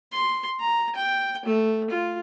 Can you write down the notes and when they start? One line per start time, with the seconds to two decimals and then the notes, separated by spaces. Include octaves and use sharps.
0.12 C6
0.60 A#5
0.95 G5
1.45 A3
1.90 F4